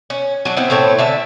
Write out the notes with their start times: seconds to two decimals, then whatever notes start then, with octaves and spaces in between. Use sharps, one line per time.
0.10 C#4
0.45 F#3 D4
0.57 B3 C4 E4
0.70 A2 A3 C4 C#5
0.98 D3 E5 A5